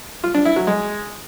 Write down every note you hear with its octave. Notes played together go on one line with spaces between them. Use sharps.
F4
D4
E4
F#3
G#3